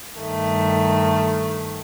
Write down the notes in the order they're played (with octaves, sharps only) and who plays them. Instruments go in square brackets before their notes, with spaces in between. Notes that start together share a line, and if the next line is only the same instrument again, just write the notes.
[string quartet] G2 D#3 A3